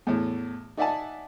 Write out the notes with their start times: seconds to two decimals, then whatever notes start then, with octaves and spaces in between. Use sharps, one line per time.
0.07 E2 A2
0.77 D#4 D5 E5 F#5 G#5 A5